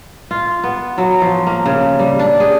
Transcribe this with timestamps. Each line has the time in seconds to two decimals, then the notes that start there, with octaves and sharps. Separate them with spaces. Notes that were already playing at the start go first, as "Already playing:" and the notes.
0.31 F4
0.64 B3
0.98 F#3
1.22 F3
1.46 A#3
1.66 C#3
1.99 G3
2.19 D4
2.40 G#4